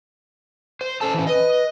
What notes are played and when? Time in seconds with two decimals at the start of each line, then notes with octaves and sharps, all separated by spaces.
0.81 C5
1.01 C#4 A4 C5 A5
1.14 E3 C#4
1.27 B4 D#5